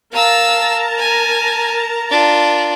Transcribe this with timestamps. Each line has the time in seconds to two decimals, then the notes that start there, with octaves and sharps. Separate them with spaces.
0.13 A#4 F5 A5 A#5 E6
0.99 G#5
2.10 D4 F4